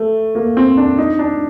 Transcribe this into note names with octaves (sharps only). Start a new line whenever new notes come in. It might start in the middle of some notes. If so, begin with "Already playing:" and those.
Already playing: A3
A#3
C4
D4
D#4
D4